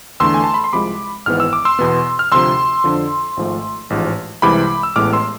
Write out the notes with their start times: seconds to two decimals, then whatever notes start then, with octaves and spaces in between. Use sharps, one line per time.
0.20 E2 D3 A3 C6 E6
0.34 G#5
0.44 A5
0.54 B5
0.64 C6
0.73 C2 C3 F3 G#3 B5 D6
1.26 G#1 G#2 E3 B3 F6
1.40 E6
1.53 D6
1.65 C6 E6
1.79 E2 B2 B3
2.19 F6
2.32 D2 C3 F3 C6 E6
2.84 F2 D3 F3
3.37 G#1 G#2 F3 A3
3.90 A1 G#2 F3
4.42 C2 C3 E3 G#3 B5 D6
4.83 E6
4.96 A1 A2 G#3 B3 D6 F6
5.13 C6 E6